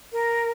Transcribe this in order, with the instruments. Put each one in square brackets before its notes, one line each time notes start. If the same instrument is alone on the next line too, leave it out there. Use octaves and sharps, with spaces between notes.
[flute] A#4